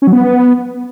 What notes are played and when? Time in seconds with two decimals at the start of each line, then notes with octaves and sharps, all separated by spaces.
0.02 C#4
0.07 F#3
0.13 B3